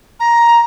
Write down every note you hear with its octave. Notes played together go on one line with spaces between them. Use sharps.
A#5